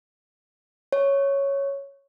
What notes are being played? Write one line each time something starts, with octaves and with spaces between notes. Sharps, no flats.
C#5